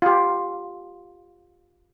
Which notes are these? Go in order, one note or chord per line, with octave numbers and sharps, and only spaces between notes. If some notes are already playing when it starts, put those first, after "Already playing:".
F4 G4